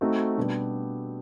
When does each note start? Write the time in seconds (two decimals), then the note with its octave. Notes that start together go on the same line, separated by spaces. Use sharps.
0.01 A3 C4 D#4 F#4
0.38 B2 G3 B3 D4 G4